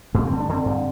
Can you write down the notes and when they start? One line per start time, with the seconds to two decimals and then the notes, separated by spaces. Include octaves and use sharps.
0.14 G2 A3
0.27 C4
0.32 D3
0.40 D4
0.49 D3 C4
0.65 G2